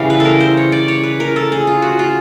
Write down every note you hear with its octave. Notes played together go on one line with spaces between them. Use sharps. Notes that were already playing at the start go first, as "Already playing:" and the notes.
Already playing: C#3 E3 G3 F5
B4
A4 A#4
C5
C#5
D5
C#5
B4
A#4
A4
G#4
F4
F#4
F4